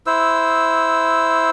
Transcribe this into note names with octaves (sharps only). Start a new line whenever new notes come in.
E4 C5 E6